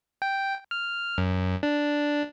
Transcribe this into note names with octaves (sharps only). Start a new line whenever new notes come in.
G5
F6
F#2
D4